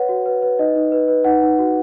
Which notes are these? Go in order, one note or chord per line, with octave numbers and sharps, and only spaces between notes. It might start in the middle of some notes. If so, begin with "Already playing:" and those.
Already playing: B4 C#5 F#5
F#4
B4
B4
D#4 D#5
D#4
B4
B4
D#4 F#5
D#4
F#4